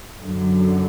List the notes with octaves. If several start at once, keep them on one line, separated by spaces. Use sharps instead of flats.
F#2 D3 F#3